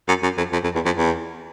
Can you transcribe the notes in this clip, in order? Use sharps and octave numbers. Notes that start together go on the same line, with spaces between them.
F#2
F#2
F2
F2
F2
E2
F2
E2